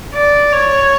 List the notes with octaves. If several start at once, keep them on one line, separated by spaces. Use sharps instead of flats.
D5
C#5